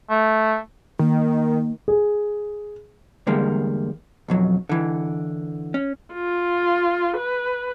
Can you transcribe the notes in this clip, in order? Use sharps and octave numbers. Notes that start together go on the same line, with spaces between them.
A3
D#3 A#3
G#4
E2 D3 G3 G#3 A#3
B1 F2 F#3
D3 E3
C#4
F4
B4